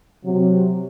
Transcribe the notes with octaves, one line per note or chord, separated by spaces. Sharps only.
C3 F#3